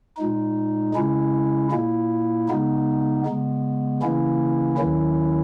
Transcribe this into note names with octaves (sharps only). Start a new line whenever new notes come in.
A#2 G#3 D#4
C#3 G#3 C#4 E4
A#2 A#3 E4
C#3 G#3 B3 D#4
C#3 G#3 B3
C#3 E3 A#3 C#4 E4
D#2 D#3 F#3 C#4 E4